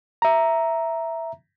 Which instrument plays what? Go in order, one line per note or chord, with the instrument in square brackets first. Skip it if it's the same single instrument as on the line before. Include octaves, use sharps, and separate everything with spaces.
[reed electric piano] E5 A#5